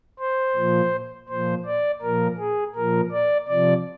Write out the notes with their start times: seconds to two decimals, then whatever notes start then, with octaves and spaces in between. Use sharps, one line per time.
0.19 C5
0.55 A#2 F3
1.29 A#2 F3 C5
1.66 D5
2.02 A#2 F3 A#4
2.39 G#4
2.75 A#2 F3 A#4
3.12 D5
3.48 C3 F3 D5